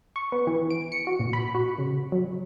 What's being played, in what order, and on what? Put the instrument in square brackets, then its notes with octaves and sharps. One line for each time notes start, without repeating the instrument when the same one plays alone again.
[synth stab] C#6
B3
E3
D7
C#7
F#4
A#2
B5
F#4
C#3
F#3